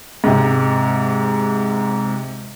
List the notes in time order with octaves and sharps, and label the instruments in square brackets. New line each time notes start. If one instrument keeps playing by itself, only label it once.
[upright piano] G#2 C3